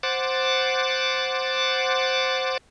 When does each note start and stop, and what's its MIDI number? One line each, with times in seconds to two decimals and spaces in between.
0.03 2.58 72
0.03 2.58 78
0.03 2.58 86
0.03 2.58 93